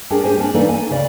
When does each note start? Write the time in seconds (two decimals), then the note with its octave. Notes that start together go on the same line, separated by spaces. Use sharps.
0.10 C#4 D4 G4 G#4 A#4
0.24 G4 C5 G#5
0.38 C#4 D4
0.54 E3 A#3 D#4 A4 B4 D5
0.69 G#5
0.89 D2 C#3 D5